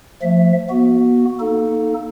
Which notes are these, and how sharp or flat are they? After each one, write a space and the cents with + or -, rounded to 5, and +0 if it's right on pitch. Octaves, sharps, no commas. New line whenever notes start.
F3 +0 A3 +35 E5 +0
B3 -35 F#4 +0
A#3 +0 D#4 +0 A4 +0